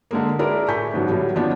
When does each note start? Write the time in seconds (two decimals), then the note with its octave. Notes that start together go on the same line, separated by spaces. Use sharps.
0.11 D3 G#3 A#3
0.39 D4 E4 G#4 A#4 B4 D5
0.68 A2 G#5 C#6 G6 B6
0.94 G#2 B2 F#3 G3
1.09 A2 F#3 G3
1.35 D#3 F3 B3 C#4 D4 F#4